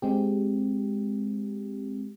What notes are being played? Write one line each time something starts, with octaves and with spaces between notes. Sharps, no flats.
G#3 C4 G4